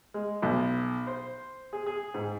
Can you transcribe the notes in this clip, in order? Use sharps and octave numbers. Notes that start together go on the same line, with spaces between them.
G#3
B1
C5
G#4
G#4
G#2